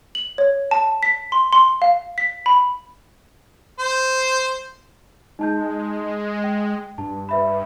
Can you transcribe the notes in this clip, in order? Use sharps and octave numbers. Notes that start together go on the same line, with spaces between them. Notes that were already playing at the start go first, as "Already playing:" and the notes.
F#7
C#5
A5
B6
C6
C6
F5
B6
B5
C5
G#3 D#4 A5 G6
G5
G2 A5
B4 E5 B5